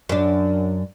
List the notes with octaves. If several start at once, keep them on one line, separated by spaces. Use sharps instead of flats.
F#2 D4